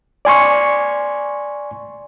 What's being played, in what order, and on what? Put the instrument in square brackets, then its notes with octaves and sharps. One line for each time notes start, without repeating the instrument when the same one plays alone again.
[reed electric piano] D5 G#5 C6 C#6